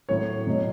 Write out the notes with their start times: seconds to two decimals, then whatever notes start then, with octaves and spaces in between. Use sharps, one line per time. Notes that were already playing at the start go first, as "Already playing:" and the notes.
0.09 A2 F#3 C#5
0.47 B2 F#3